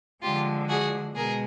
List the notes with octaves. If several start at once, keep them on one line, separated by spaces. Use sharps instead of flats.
D3 F3 G#3 F4 G4
F#4 G#4
B2 G#3 G#4 A#4